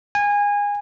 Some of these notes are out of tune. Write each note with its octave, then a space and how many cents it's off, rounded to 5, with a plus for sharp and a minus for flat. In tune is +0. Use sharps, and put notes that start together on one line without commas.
G#5 -25